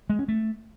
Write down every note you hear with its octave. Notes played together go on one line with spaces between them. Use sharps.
G#3
C#4
A3